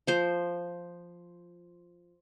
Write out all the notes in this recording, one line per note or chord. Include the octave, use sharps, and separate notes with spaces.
F3 C5